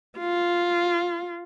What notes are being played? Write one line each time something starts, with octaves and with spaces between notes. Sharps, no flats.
F4